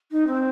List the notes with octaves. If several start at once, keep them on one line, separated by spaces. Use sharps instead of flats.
D#4
C4